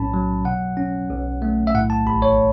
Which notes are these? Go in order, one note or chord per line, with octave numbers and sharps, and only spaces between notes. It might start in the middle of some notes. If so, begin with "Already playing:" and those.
Already playing: B1 A2 C#4 A5 B5
F#3
B2 F#5
C#4
B1
A3
E5
A2 F#5
A5
A1 B5
C#5